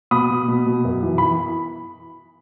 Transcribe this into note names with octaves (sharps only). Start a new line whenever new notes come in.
B2 B5 D#6
B2
B2
B2
F#2
E3
E3 B5